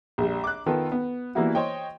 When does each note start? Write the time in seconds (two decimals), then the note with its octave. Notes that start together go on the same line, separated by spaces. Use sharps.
0.18 A#1 G3
0.44 D6 F#6
0.66 D#3 B3 F4 A4 B4
0.92 B3
1.35 E3 G3 A#3 B3 E4 F#4
1.55 C5 C#5 D#5 G5